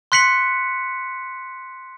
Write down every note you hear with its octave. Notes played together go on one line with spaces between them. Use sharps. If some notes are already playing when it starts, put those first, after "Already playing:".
C6 F#6 B6 C#7 F#7